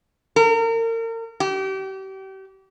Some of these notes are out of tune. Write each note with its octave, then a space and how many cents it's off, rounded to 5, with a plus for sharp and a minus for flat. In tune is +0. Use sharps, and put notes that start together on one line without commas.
A#4 -35
G4 -35